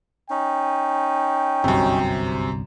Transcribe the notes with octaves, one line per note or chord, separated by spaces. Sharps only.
C#4 D#4 G5
G1 C2 F#2 C3